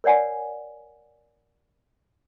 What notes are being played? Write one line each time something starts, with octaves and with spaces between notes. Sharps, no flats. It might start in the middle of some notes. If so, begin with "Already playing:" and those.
A#4 C#5 D5 F#5 G#5